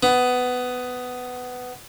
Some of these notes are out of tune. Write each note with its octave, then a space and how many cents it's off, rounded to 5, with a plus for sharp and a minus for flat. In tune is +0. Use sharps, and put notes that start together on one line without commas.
B3 +15